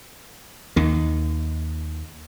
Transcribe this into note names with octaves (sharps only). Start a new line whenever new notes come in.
D#2 D#3